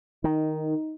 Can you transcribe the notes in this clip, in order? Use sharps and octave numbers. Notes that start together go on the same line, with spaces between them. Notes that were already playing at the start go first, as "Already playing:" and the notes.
D#3 D#4